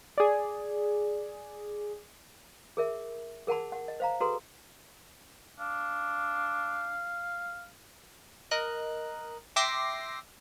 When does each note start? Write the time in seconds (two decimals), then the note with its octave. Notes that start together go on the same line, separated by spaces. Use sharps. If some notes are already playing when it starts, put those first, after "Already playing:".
0.18 G#4 D5
2.77 G#4 A#4 E5
3.47 G#4 A#4 F#5 A5 B5
3.72 F#5
3.88 D#5
4.00 C5 F5 A#5
4.20 F#4 G#4 A4 B4 A#5 C6
5.59 D4 F5
8.51 A#4 D#5 F#6
9.56 E5 G5 C6 D6 A#6 C7